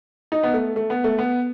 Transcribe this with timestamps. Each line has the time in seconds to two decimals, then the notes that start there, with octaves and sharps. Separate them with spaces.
0.32 D#4
0.43 B3
0.53 A3
0.76 A3
0.90 B3
1.04 A3
1.18 B3